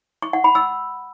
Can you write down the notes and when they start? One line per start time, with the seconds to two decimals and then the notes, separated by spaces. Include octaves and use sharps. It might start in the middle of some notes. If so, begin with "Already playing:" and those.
0.22 C#6
0.33 F#5
0.44 B5
0.55 E6